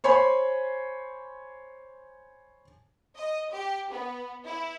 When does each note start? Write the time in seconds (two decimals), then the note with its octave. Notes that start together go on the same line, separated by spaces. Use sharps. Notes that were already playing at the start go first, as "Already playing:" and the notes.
0.04 C5 C#5 G#5 B5 C6
3.15 D#5
3.52 G4
3.91 B3
4.46 E4